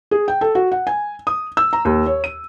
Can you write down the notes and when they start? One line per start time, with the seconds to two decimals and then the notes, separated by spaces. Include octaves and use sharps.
0.11 G#4
0.28 G5
0.41 A4
0.55 F#4
0.72 F#5
0.87 G#5
1.27 D#6
1.57 E6
1.73 A#5
1.85 D#2
2.06 C#5
2.24 D#7